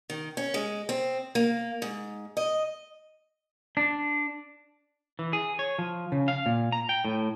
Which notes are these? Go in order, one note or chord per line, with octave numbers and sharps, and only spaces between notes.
D#3
C#4
G#3
C4
A#3
G#2
D#5
D4
E3
G#4
C#5
F3
C#3
F5
A#2
A#5
G5
A2